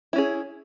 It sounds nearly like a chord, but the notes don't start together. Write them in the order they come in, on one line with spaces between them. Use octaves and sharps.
E4 C#4 G#4